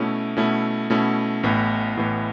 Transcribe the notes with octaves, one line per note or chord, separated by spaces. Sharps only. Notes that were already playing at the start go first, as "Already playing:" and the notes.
Already playing: B2 A3 C#4 E4
B2 A3 C#4 E4
B2 A3 C#4 E4
A1 A2 E3 B3
A1 A2 E3 B3